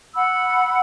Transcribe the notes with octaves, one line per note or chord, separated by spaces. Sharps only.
F#5 B5 E6